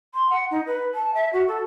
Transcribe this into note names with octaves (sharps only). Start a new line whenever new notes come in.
C6
F#5
D#4
B4
A5
E5
F#4
A4